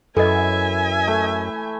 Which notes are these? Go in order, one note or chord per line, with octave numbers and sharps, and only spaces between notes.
F#2 E3 A4 D#5 E5 G#5
A3